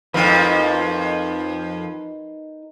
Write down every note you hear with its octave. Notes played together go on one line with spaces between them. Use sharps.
F2 F3 D#4 A#4 B4